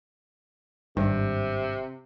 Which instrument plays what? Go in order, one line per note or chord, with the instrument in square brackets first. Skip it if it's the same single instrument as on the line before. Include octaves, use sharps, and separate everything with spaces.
[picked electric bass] G#1 G2 [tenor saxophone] C3